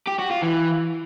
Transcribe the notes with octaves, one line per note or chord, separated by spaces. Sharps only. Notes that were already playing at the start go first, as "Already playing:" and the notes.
G4
F#4
F4
E3